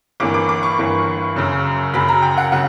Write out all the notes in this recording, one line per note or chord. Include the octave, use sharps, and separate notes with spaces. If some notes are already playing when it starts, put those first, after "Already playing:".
G1 G2 E3 A#3 D6
D6
D6
C#6
G1 G2 E3 A#3
F#2 C#3 F#3
F#2 C#3 F#3 B5
A#5
G5
F#5
C#3 F#3 F#5